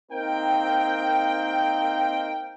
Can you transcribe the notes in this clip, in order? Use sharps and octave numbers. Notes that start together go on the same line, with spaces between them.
A#3 C4 D#4 A#4 G5